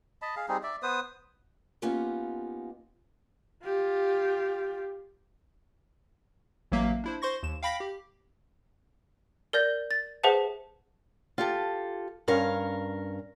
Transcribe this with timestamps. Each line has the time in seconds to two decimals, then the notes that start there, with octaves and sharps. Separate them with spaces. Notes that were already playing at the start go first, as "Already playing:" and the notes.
0.22 D#5 A5 B5
0.36 G#4 F5
0.48 G3 C4 D#4 G#4
0.63 D5 E5
0.83 B3 B4 C5 D#6
1.82 A#3 B3 C#4 D#4 F4 G4
3.64 F4 G4
6.72 A1 F#3 A#3 E5
7.04 D4 E4 C5
7.22 C5 C6 C#6 A#6
7.43 D#2 E7
7.62 F5 G5 B5 A#6 B6
7.80 G4
9.53 A#4 D5 G6 A#6
9.91 A6
10.23 G#4 B4 C5 E5 F#5 A5
11.38 F4 G4 A4
12.28 G2 C#4 A#4 F5